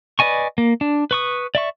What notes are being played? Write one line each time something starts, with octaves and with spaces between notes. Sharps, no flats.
B4 D5 D#5 G#5 C#6
A#3
D4
B4 C#6 D#6
D5 E5 C#6